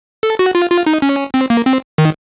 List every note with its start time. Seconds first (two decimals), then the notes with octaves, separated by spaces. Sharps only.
0.23 A4
0.39 F#4
0.55 F4
0.71 F4
0.86 D#4
1.02 C#4
1.34 C4
1.50 A#3
1.66 C4
1.98 D#3